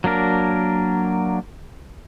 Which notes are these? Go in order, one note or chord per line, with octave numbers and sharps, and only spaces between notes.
F#3 A#3 D4 A#4